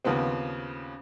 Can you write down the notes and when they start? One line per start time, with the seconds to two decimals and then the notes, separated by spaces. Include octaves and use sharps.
0.04 D#2 C#3 F3 B3 C4